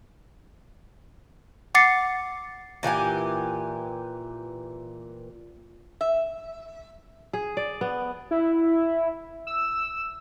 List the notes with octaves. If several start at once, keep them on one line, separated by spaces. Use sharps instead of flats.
F#5 D6 A6 C7 C#7
A#2 E3 G4 G#5
E5
G#4
D5
B3
E4
E6